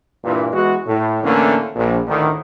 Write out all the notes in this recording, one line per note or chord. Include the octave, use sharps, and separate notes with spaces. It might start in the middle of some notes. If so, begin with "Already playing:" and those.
G2 A#2 E3
E2 E3 G#3 F#4
A2
A2 D3 E3 A3 A#3 C#4
A#1
D2 A2 D3 D#3